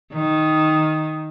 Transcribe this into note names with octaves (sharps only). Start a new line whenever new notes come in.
D#3